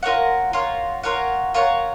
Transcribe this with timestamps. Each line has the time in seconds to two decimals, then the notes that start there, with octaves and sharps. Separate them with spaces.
0.03 F4 A#4 C#5 F#5
0.53 F4 A#4 C#5 F#5
1.03 F4 A#4 C#5 F#5
1.54 F4 A#4 C#5 F#5